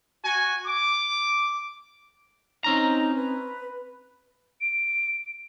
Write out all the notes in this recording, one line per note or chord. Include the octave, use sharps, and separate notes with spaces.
F#4 G#5
D6
C4 C#4 D#4 A#5
B4
D7